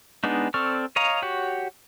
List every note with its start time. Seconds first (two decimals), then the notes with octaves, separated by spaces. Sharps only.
0.24 G#3 B3 D4 D#4
0.54 C4 A4 D5 C#6 F6
0.96 C#5 D#5 F5 A#5
1.22 F#4 G4 C#5